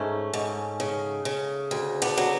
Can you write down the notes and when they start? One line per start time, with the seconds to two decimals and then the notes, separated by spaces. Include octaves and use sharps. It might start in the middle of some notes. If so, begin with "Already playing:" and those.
Already playing: G#2 A3 C#4
0.33 G#2
0.80 C#3
1.25 C#3
1.71 D2
2.02 B3 D4
2.18 F#3